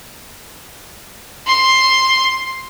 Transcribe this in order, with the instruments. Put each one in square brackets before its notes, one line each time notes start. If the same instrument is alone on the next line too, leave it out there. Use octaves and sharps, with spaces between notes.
[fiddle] C6